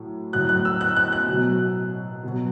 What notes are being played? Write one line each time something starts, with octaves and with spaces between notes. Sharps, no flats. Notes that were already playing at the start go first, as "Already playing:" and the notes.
Already playing: A2 F#3
A2 F#3 F#6
F#6
E6
F#6
F#6
F#6
B2 F#3
B2 F#3